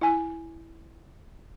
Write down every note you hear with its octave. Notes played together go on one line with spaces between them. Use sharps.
E4 G#5